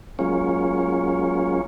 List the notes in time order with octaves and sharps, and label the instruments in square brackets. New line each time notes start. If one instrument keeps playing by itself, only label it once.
[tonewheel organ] F#3 G#3 A#3 C#4 F4 C#5